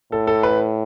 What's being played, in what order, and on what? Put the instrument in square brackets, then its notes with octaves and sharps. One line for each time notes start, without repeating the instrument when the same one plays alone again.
[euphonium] A2 [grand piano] A4
[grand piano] A4
B4